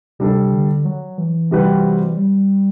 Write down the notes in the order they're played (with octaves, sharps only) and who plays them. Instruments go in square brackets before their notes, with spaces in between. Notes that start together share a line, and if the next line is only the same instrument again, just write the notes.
[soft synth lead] C3 [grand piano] G3 D4 A4
[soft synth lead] D3
F#3
E3
[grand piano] C3 G3 C4 F#4 B4
[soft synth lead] G3